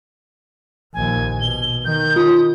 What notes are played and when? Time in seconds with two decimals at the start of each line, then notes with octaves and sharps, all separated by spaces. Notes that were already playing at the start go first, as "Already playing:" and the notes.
0.94 A#1 D#2 G#5
1.41 B2 G7
1.85 D#3 G6
2.16 F4 D#6